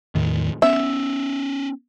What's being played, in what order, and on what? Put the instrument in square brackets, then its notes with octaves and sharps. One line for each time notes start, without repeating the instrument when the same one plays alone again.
[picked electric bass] E2 A2 D#3
[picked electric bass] B3 C#4 [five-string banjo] E5